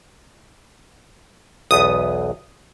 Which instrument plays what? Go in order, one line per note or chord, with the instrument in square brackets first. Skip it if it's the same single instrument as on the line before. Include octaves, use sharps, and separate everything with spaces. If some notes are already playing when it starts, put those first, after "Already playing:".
[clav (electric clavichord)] B1 E2 B3 [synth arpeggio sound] D#6